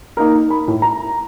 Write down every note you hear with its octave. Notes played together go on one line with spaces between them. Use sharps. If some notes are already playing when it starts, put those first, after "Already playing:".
A#3 D#4 A#4
B5
A2
A#5